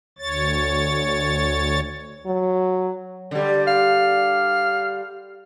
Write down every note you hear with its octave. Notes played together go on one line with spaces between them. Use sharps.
D2 C#5 A6
F#3
D3 G3
F5